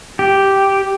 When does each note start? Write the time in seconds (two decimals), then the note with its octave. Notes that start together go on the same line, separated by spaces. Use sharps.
0.19 G4